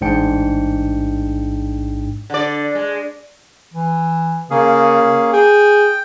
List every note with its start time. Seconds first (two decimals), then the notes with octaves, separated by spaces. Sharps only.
0.01 A1 G#2 D4 G5 C#7
2.30 D3 D5
2.75 G#3
3.74 E3
4.50 C#3 A#3 C#4 G#4
5.33 G#4 G5